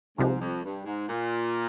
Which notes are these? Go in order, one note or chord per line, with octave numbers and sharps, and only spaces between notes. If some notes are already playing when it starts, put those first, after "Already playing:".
C2 G#2 C3 F3 G#3
F2
G2
G#2
A#2